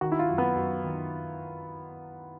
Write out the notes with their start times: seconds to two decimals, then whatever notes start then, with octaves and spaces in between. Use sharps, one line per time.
0.01 D#3 F#4
0.12 E4
0.19 F4
0.30 F#2
0.38 B3
0.56 F#2
0.84 D#3